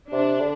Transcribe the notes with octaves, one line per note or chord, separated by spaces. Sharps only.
C3 D4
D3